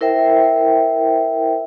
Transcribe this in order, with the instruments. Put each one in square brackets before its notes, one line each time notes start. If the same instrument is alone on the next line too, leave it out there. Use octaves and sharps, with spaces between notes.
[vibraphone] E4 A#4 C5 E5 G5